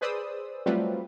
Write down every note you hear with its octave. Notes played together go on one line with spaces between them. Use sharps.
G#4 B4 C5 D5 D#6 E6
F#3 G3 A3 C4 F4 B4